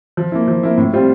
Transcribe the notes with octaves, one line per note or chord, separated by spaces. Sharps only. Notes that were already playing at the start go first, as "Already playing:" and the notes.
F3
A#3 E4
F3
A#3 E4
A2
G3 C4 F4